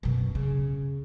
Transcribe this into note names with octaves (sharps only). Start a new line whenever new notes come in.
F#2 B2
C#3